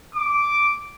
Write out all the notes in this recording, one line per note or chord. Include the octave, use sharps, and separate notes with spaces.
D6